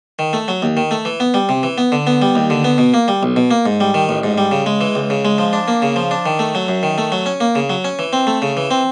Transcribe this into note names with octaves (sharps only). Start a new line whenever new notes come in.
D#3
A3
F#3
D#2
D#3
A3
E3
B3
G3
C3
E3
B3
D3
B3
G3
D#2
D3
B3
B2
A#3
G3
B1
B2
A#3
G#2
G3
D#3
A1
G#2
G3
C#3
G#3
E3
C#2
C#3
G#3
F3
D4
A#3
C#3
F3
D4
D#3
A3
F#3
F#2
D#3
A3
F#3
C#4
A#3
C#3
F#3
C#4
E3
C4
A3
C#3
E3
C4